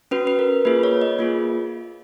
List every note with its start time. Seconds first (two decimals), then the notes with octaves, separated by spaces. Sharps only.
0.11 C#4 F#4 B4
0.27 B4
0.39 A#4
0.65 A#3 F4 G#4 B4
0.83 C#5
1.02 D#5
1.19 A#3 F4 G#4